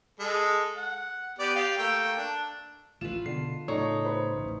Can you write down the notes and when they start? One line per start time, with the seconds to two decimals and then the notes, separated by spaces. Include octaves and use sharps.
0.19 G#3 A4
0.77 F#5
1.39 B3 G4 D5
1.55 G4 F5
1.77 A3 A#3 G5
2.17 D4
3.01 A1 A3 F4 B4 E7
3.26 B2 D3 C7
3.68 A2 C#3 D#4 A4 C#5 D5 C#6
4.05 B4 C5 B5
4.37 A1